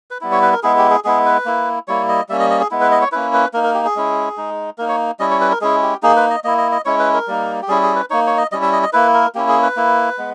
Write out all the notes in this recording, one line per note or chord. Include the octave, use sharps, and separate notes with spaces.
B4
G3 B3 E4
C#5
B4
A#4
G#3 B3 E4 G#4
G4
G#4
G#3 B3 E4 G#4
B4
A#3 E4
G3 A#3 E4 C#5
D#5
G3 A#3 C#4 E5
D#5
D#5
G#4
G#3 B3 E4
B4
D#5
C#5
A#3 C#4 E4 B4
B4
A#3 D#4 A#4
A#4
G4
G#4
G#3 C#4 E4
G#3 D#4
A#3 D#4 A#4
C#5
G3 C#4 E4 D#5
C#5
B4
A#4
G#3 C#4 E4 G#4
G4
A#3 D#4 G#4
B4
D#5
A#3 E4 D#5
D#5
D#5
G#3 C#4 E4 C#5
B4
A#4
G3 A#3 D#4
G4
G3 C#4 E4 G#4
G#4
B4
A#3 D#4 C#5
C#5
D#5
G3 C#4 E4 D#5
E5
D#5
D#5
A#3 E4 B4
A#4
A#3 C#4 E4 G4
G#4
B4
A#3 E4
G#3 B3